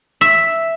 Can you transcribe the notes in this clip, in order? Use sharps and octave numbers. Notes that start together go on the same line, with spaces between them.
E5